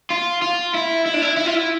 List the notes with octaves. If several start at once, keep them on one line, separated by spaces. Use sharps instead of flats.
F4
F4
E4
E4
D4
E4
E4
F4
E4